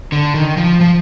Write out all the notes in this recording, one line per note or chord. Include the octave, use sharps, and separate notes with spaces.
D3
D#3
F3
F3